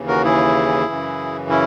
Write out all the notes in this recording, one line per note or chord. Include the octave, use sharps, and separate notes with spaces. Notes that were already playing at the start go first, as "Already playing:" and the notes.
Already playing: D#2 C#3 E3
F#4 A#4
E4 G#4
F#2 C#3 E3
C#4 E4